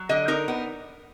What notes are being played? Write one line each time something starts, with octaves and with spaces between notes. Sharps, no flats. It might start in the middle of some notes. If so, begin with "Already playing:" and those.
Already playing: F#3
D3 D#5
D#4 A#4
B3